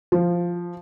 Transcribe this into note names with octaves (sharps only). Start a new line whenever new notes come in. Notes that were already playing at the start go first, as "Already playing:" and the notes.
F3